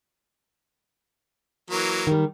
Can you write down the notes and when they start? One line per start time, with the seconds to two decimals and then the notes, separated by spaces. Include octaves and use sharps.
1.71 E3 F#3 A#3
2.07 D#3 G3